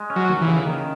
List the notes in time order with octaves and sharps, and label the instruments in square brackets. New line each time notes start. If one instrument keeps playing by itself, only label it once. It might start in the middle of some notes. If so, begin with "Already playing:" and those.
Already playing: [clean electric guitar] G#3
C#4
[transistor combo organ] F#3
[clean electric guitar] D#2
[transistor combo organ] E3
[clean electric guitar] C#3
D#3